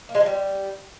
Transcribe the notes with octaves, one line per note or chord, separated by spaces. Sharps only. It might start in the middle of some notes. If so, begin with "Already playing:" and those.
A#3
G#3
F3
G3